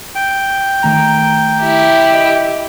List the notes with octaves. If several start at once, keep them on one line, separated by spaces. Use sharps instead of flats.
G5
D#3 A3 A#5
E4 G4
D#5